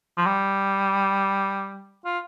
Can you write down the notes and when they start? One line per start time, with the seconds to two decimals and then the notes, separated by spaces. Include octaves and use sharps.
0.17 F3
0.26 G3
2.05 F4